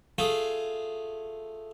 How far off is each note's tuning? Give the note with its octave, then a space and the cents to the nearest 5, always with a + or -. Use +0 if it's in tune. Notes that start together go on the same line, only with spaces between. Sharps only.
A3 +0 F4 +0 G#4 +0